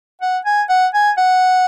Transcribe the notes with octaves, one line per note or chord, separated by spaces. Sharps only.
F#5
G#5
F#5
G#5
F#5